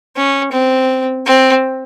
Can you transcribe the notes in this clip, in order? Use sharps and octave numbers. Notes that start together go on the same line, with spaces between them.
C#4
C4
C4